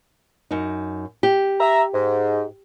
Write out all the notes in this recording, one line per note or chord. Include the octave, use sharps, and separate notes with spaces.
F#2 D#4
G4
E5 A#5
G#2